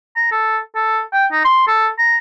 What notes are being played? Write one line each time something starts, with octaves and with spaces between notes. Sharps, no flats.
A#5
A4
A4
G5
D#4
C6
A4
A#5